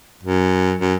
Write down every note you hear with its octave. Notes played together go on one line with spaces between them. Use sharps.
F#2
F#2